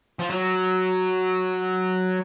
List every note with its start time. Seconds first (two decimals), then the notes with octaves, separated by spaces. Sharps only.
0.19 F3
0.30 F#3